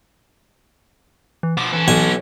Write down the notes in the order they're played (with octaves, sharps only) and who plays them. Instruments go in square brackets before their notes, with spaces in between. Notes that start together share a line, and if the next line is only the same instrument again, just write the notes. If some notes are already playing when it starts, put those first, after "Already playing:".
[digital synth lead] E3
[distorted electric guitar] B2 F3 [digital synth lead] D6
[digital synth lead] E3 [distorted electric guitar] C#4 A4
[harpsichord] B1 G#5